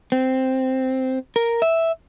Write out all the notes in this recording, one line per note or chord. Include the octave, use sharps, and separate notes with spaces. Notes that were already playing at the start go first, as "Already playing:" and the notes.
C4
A#4
E5